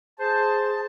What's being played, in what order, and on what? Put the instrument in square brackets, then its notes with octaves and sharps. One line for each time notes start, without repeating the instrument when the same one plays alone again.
[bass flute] G#4 [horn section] C5 [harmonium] A5